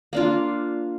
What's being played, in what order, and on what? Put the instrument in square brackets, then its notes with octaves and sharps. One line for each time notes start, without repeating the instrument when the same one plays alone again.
[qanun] A#3 D4 F4